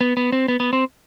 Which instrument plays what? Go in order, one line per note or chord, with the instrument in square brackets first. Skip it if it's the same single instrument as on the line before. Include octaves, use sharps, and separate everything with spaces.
[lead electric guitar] B3
B3
C4
B3
B3
C4